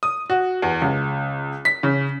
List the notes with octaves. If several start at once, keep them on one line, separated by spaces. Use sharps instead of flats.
D#6
F#4
E2
C#2
B6
C#3